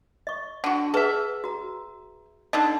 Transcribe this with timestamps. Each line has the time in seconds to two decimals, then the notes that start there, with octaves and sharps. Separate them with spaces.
0.27 D#5 C#6
0.64 D3 F#4 F#5
0.94 G#4 A4 B4 E5
1.44 F#4 A#5
2.53 D3 D4 D#4 A4 D#5